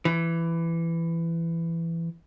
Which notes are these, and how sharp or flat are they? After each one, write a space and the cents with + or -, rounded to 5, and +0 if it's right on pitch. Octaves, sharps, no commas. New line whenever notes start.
E3 +15